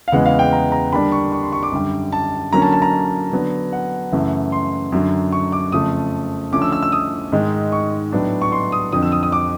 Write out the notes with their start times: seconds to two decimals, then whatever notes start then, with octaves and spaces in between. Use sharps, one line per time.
0.08 F5
0.12 E2 C#3 E3 G#3 B3 F#5
0.26 F5
0.39 G5
0.53 A#5
0.72 A#5
0.92 D3 G3 A#3 D4 B5
1.12 C#6
1.32 C#6
1.43 C6
1.53 C#6
1.63 D6
1.72 F#2 D3 G3
2.12 A5
2.52 D3 F#3 A#3 C#4 A#5
2.62 A5
2.72 A5
2.82 A#5
3.32 D3 F#3 B3 D4
3.73 F#5
4.12 F#2 C#3 E3 A3
4.52 C6
4.92 F#2 D3 F#3
5.32 C#6
5.52 D6
5.72 F2 C#3 F3 A3 D#6
6.52 D3 F3 A3 C#4 D6
6.62 E6
6.72 E6
6.83 E6
6.92 D#6
7.32 G#2 D#3 G#3
7.72 C#6
8.13 A2 F#3 B3 D4
8.42 C#6
8.52 C6
8.72 D#6
8.92 F2 D3 F3 D#6
9.03 E6
9.12 D#6
9.23 D#6
9.32 D6